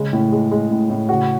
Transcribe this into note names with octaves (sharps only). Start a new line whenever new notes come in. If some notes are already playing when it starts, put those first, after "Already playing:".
Already playing: C#3 G#3
A2
G#3
G#3
A2
A2
C#3 F#4